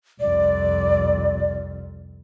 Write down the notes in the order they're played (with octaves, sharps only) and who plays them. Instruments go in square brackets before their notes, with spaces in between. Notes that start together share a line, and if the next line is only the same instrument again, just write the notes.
[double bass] C2 F2 [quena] D5